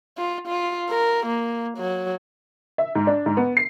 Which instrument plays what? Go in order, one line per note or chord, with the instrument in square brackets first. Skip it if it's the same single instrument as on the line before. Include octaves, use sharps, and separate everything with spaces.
[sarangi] F4
F4
A#4
A#3
F#3
[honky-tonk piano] E5
G#2
D4
G#2
B3
C7